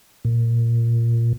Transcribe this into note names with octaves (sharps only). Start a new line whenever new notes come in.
A#2